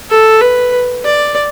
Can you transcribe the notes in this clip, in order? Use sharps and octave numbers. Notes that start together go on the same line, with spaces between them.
A4
B4
D5